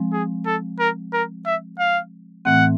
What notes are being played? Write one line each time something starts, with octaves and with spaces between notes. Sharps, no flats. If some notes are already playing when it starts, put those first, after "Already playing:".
Already playing: F3 G#3 C4
G#4
A4
A#4
A#4
E5
F5
A2 E3 A3 C4 F#5